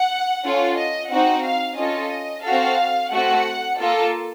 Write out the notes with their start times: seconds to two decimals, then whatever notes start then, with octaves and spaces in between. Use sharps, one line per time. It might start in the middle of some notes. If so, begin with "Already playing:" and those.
Already playing: F#5
0.44 C#4 F4 A4
0.76 D#5
1.10 C4 D#4 F#4 F#5
1.44 F5
1.77 C#4 F4 A4 D#5
2.44 C4 F#4 A4 F5
3.12 A3 C4 F#4 F#5
3.79 A#3 F4 A4